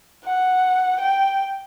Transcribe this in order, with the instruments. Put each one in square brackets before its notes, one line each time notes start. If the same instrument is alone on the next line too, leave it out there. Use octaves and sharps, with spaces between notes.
[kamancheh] F#5
G5